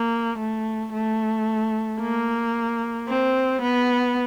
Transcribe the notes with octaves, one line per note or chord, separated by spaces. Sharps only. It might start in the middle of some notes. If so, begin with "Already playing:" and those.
Already playing: A#3
A3
A3
A#3
C4
B3